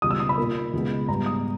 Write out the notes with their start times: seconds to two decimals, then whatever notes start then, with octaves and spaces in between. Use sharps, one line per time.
0.02 C#2 B2 G3 D#6
0.11 E6
0.20 D#6
0.29 B5
0.38 A#2 A#3
0.73 C#2 B2 G#3 B3
1.08 G#2 G3 B3 A#5
1.26 D#6